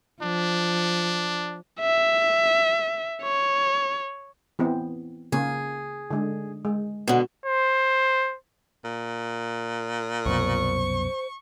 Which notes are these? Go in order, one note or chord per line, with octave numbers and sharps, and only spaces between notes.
F3 D4
E5
C#5
E3 B3 C4
C#3 A#3 G#4
D3 G#3
G#3
B2 D3
C5
A#2
C2 F#2 B2 C5 C#6